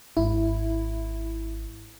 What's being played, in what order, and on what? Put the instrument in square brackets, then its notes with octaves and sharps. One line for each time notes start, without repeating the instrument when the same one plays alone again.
[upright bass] G#1 [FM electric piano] E4